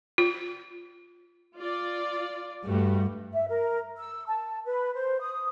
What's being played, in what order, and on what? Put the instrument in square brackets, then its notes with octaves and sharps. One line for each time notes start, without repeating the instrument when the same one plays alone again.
[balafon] F4
[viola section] F4 D5
[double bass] G2 [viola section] G3 A3 F#4
[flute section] E5
A#4
E6
A5
B4
C5
D#6